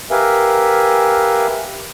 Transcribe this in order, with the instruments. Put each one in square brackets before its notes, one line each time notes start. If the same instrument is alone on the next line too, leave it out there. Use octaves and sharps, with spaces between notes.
[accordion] G4 A#4 B4 E5 F5 G#5